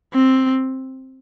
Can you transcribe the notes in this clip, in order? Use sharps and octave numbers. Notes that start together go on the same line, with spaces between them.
C4